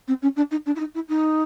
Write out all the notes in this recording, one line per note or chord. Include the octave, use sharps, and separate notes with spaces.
C4
C#4
D4
D#4
D4
E4
D#4
E4
D#4